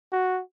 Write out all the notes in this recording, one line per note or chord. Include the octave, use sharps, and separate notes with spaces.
F#4